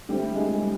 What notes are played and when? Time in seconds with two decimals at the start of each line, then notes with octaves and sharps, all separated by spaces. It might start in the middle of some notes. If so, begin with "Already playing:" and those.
0.09 D3 G3 C4 E4 G4
0.35 G#3 G#4
0.62 G3 G4